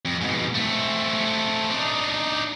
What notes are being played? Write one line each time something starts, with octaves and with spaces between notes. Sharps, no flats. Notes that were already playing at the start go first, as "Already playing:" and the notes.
F2
G#2 B2
A3 C4
D4 D#4